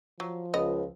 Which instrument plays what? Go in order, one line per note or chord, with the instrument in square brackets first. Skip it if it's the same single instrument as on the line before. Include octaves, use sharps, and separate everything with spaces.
[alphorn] F3 [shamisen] F#3
[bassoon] C#2 [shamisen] B3 D#5